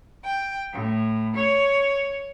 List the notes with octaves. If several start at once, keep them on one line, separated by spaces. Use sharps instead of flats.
G5
A2
C#5